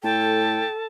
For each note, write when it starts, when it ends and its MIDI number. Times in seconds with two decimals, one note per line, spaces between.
0.03 0.62 45
0.03 0.86 69
0.03 0.68 79
0.03 0.87 81